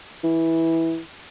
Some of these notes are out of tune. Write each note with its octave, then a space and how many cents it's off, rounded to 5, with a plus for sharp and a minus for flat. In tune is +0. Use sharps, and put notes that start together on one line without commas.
E3 -10